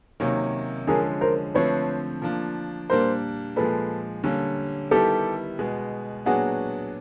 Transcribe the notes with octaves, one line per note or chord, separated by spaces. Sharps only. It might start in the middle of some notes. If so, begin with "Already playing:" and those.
C3 D#3 F#3 A#3 C#4
D3 F3 G#3 C#4 G#4 A#4
A#4 C5
D3 F3 A3 C4 B4 C#5
F3 A#3 D4
A#2 G3 A#3 D4 A#4 C5
A#2 F3 G#3 A4 B4
D3 G3 A#3 C#4
D#3 G3 B3 E4 G4 A4
B2 G#3 B3
A#2 F#3 B3 D4 F#4 G#4